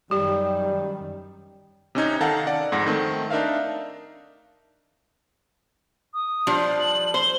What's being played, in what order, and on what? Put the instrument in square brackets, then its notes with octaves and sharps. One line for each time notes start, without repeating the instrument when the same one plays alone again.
[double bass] F#2 D#3 [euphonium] G3 [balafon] G4
[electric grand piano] C3 C#4 D#4 G#6
D#3 A4 F5 F#5 A5 A#5
D5 F#5
F2 G#2 F#5 A#6
D#3 A3 C4
D4 D#4 A#4 E5 F5
[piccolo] D#6
[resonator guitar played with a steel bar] F3 G3 D4
[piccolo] F#7
[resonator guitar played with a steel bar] C5 [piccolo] G7